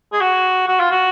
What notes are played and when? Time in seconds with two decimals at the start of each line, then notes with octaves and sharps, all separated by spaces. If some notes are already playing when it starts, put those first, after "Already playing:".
0.13 G#4
0.21 F#4
0.68 F#4
0.80 F4
0.91 F#4